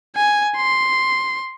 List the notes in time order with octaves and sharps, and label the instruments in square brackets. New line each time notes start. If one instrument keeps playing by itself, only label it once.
[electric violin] G#5
C6